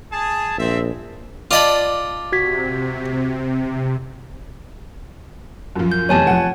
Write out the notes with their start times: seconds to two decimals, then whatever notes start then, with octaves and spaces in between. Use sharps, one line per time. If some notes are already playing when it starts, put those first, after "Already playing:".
0.12 G#4 A5
0.58 A#1 C4 E5
1.51 F4 D5 D#5 A5 B5
2.32 C3 F#4 G#6 B6
5.76 F#2 F3
5.92 G6
6.09 F1 E2 C#5 G#5 A5
6.27 F3 F#5